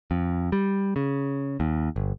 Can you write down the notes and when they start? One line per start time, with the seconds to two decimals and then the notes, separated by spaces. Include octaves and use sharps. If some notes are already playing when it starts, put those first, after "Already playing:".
0.11 F2
0.52 G3
0.96 C#3
1.60 D#2
1.96 G1